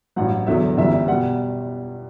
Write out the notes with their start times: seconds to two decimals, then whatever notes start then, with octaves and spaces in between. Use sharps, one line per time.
0.16 A1 G2 F#3 F#5
0.47 E2 D3 F#3 E5
0.77 G1 F#2 E3 G3 E5
1.08 B2 G3 F#5